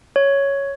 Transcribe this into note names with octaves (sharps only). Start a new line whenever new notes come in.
C#5